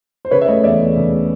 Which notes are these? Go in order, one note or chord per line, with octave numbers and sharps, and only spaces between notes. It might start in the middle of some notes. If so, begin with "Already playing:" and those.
C5
C#3 B4 C#5
E5
A3 C#5 D#5
E2 D5 E5
E3
C#3
A3